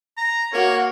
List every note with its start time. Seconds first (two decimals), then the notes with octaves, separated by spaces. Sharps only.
0.18 A#5
0.53 A#3 F#4 C#5